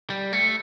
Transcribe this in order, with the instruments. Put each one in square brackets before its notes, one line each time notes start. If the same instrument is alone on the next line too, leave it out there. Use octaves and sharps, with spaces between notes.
[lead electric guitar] G3
A3